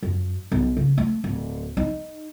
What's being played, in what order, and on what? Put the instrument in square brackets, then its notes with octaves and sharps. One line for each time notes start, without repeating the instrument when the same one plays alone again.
[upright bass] F#2
B1
C#3
A3
D1
D#4